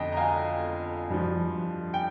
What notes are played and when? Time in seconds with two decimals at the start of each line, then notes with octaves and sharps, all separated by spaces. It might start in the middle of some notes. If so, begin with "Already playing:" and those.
Already playing: F2 D3 D#5 G5
0.12 A#5
0.17 F5 G#5
1.10 G2 F3
1.94 G5